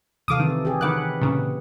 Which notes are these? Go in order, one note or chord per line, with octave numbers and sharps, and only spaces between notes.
C3 E3 A4 F5 D6 D#6
D#3
G4 G#4
D#3 E3 B4 F#5 D6 F#6
A#2 C#3